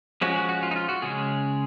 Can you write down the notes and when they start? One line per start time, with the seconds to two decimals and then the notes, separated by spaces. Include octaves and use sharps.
0.21 F3 G#3 C#4 F#4
0.36 F#4
0.49 F#4
0.63 F4
0.71 D#4
0.76 F4
0.89 F#4
1.02 C#3 G#3 C#4 G#4